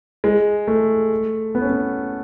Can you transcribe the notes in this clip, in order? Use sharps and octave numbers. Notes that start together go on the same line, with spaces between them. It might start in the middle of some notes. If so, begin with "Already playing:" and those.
G#3
A3
B3
C#4
B3